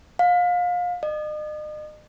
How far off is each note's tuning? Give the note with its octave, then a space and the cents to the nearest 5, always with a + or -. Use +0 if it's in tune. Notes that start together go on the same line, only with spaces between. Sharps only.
F5 +30
D#5 -40